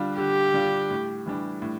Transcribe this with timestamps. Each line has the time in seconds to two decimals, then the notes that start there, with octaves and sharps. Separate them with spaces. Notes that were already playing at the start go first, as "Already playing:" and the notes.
Already playing: D3 G3 D4 F4
0.18 D3 G4
0.54 G3 D4 F4
0.91 A2
1.26 E3 G3 D4
1.62 A2